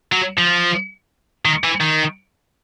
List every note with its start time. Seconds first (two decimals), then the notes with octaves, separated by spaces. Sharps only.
0.12 F#3
0.39 F3
1.45 D#3
1.64 E3
1.81 D#3